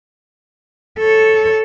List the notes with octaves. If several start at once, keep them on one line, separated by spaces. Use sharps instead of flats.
A4 C#5